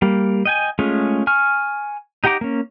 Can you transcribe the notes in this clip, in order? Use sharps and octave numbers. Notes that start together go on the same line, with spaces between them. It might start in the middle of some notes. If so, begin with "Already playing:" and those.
G3 A#3
D#5 G5 G#5
G#3 A3 C#4 F4 G#4
G#5 C#6 F6
D#4 G4 F#5 A#5 D6
A#3 C#4